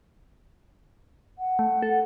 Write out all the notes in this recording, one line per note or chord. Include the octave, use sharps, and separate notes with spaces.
F#5
A3
A4